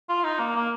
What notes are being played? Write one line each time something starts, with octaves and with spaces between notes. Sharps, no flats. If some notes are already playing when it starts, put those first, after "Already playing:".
F4
D#4
A#3
A#3